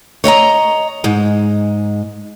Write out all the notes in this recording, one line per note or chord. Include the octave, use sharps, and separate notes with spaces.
C#5 D#5 F#5 A#5
G#2 G#3